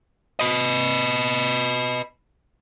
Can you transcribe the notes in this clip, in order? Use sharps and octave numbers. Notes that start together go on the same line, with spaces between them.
B4 D#5